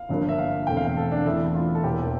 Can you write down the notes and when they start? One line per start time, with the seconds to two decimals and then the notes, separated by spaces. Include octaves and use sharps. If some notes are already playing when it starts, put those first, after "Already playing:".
Already playing: F5
0.09 G1 G2 F3 A#3
0.29 E5
0.39 F5
0.67 E1 E2 D3 A3 C4 G5
0.77 F5
0.87 F5
0.97 A4
1.12 D4
1.25 E2 E3 A3 C4 E4
1.46 E4
1.55 F4
1.75 A4
1.84 E1 E2 E3 A#3 G4